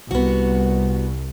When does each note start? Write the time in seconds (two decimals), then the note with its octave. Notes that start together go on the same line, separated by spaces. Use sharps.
0.11 C2 B3 F#4